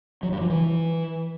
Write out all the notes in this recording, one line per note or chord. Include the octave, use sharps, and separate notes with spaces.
F#3
G2
F3
E3